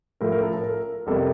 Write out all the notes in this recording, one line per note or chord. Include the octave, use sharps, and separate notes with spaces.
A2 F3 A3 A#4
A#4
A4
A4
A#4
F2 C3 G3 A#3 A4